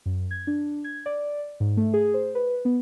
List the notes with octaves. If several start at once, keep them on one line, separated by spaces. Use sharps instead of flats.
F#2
G#6
D4
G#6
D5
G#2
A3
G#4
C5
B4
B3